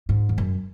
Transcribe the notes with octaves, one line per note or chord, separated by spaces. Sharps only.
G#2
E2
F#2